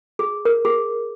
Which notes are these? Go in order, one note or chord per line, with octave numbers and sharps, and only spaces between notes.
G#4
A#4
G#4